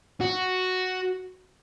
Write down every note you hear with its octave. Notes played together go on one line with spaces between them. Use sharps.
F#4